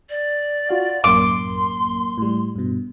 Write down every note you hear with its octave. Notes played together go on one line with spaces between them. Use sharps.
D5
F4 F#4 F5
A1 F#2 A#3 C6 D6
A2 G3
G2 B2